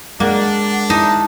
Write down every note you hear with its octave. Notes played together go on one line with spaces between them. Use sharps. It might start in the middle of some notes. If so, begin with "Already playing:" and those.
G#3 A#3 D4 A#4 F#5
D#4 E4 A5